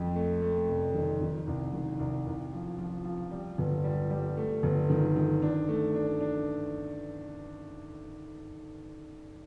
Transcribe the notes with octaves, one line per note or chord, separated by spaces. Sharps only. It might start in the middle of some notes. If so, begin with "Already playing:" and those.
Already playing: F2
A3
A3
F1
D#3
D#3
C2
D#3
C2
C2
F3
F3
F3
G3
G1
G3
G3
A3
G1
D#3
D#3
D4
A3
D4
D4